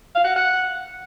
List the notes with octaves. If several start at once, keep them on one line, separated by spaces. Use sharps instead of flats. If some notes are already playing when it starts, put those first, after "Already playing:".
F5
F#5
F#5